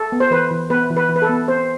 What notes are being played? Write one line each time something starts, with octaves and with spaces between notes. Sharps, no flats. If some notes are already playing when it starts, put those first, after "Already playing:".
Already playing: A4
B3
C5
E3 B4
E3
B3 B4
E3
B4
E3
B4
A4
B3
C4 C5